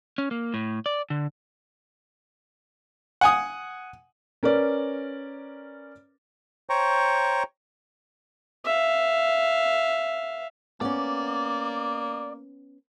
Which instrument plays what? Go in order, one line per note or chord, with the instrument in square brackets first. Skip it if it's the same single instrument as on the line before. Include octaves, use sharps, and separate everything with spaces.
[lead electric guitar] C#4
A#3
A2
D5
D3
[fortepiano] F#5 G#5 D#6
[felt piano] C#4 A#4 B4 D5
[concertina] C5 C#5 G5 A#5 C#6
[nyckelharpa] E5 F5
[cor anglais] A#3 [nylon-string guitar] B3 C#4 [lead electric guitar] D5